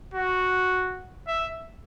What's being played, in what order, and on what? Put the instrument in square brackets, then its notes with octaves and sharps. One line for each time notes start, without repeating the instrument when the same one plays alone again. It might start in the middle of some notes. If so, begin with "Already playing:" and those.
[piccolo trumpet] F#4
E5